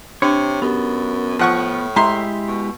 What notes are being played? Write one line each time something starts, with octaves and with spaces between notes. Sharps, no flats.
C3 D4 C#5
F#2 B3 G4
A2 F3 F#5 C#6
G#3 E4 G4 E5 A#5 C6
B2